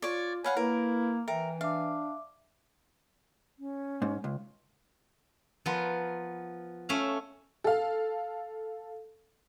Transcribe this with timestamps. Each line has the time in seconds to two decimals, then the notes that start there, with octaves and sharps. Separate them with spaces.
0.02 F4 C#5 D5
0.44 B4 C#5 F5 F#5 G#5
0.57 A#3 E4 A#4 B4
1.28 E3 A#4 E5 G5
1.61 D4 E5 F5 D6
3.59 C#4
4.02 G#2
4.24 C#2
5.66 F3 B3 F4 A#4
6.89 A3 C#4 E5 F5
7.64 A4 F5